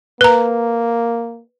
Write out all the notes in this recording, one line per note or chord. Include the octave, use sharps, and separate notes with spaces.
A#3 B4 A#5